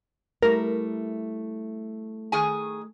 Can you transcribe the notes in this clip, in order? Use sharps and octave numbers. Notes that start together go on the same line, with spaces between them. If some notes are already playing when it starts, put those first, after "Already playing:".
G3 A3 E4 A#4
D#3 G#4 G#5